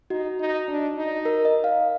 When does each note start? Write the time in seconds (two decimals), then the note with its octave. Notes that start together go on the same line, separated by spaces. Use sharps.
0.10 D#4 F#4
0.40 D#4
0.68 D4
0.97 D#4
1.25 A#4
1.45 D#5
1.64 F5